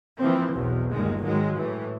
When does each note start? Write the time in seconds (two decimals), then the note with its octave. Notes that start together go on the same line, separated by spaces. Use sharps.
0.19 E3 F3 A#3 C4
0.53 B1 E2 B2
0.90 G1 D#2 D#3 G#3
1.21 G#2 D#3 F#3 G#3
1.54 A2 E3